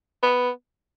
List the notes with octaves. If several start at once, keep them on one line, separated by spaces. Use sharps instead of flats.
B3